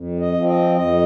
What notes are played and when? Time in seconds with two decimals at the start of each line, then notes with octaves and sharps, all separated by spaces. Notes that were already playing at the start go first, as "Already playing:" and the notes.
Already playing: F2
0.20 D#5
0.34 F3 C4
0.48 D#5
0.76 F2 D#5